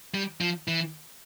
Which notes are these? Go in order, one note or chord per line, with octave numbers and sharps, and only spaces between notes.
G3
F3
E3